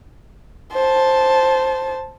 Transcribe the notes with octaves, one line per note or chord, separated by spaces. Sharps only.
C5 A5